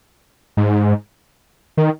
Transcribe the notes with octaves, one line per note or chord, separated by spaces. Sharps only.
G#2
D#3